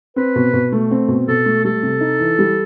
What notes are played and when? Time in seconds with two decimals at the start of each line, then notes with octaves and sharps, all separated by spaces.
0.16 C4 B4
0.36 B2
0.53 B2
0.72 A3
0.91 C4
1.08 B2
1.28 B2 A4
1.46 A3
1.64 G3 A4
1.83 C3
2.01 D#4
2.19 E3
2.39 G3